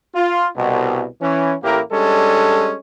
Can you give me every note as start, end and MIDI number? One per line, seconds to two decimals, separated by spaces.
0.15 0.48 65
0.56 1.05 36
0.56 1.05 47
1.22 1.54 52
1.22 1.54 61
1.63 1.80 33
1.63 1.80 45
1.63 1.80 58
1.63 1.80 64
1.63 1.80 67
1.63 1.80 70
1.92 2.75 55
1.92 2.75 56
1.92 2.75 61
1.92 2.75 62
1.92 2.75 69